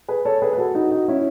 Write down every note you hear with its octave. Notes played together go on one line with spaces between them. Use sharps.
G#4 B4
A4 C#5
G#4 B4
B4
F#4 A4
D#4 F#4
D#4 F#4
C#4 E4